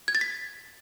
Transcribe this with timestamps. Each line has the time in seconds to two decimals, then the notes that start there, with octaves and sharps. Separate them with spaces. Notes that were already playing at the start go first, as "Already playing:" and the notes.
0.08 G#6
0.15 A6
0.21 B6